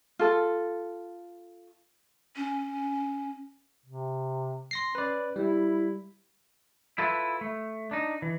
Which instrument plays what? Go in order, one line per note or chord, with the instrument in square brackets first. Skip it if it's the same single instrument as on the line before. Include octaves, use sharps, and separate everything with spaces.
[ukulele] F4 A4
[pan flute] C#4
[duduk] C3
[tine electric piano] C6 A#6 C7
[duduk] C#4 [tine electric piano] B4 D5
[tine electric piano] G3 [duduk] E4
[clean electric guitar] E4 F4 A4 B4 E5
A3
D4 D#4
E3